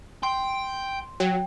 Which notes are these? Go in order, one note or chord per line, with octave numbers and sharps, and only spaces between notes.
G5 C6
F#3 G5